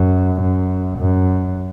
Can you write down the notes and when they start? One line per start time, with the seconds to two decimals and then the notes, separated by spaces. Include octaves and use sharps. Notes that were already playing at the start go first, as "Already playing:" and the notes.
Already playing: F#2
0.41 F#2
0.99 F#2